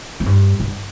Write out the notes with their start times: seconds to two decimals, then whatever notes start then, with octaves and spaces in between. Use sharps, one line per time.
0.20 F2
0.26 G2
0.60 G2